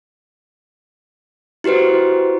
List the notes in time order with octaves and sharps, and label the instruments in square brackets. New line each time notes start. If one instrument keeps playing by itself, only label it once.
[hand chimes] E4 F#4 G4 B4 C5